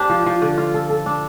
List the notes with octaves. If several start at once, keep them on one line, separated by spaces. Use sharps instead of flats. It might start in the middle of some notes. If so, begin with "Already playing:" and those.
Already playing: D4 G4 C5
F3
F3
D3
F4
A4
A4
D4